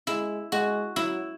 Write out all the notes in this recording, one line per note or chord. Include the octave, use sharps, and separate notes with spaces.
G#3 E4
G#3 F#4
F#3 E4